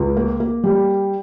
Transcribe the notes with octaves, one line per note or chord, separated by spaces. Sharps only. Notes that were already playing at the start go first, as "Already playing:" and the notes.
Already playing: C#2
A#3
A#3
G3